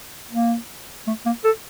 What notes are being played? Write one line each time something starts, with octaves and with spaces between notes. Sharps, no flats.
A#3
A3
A#3
A4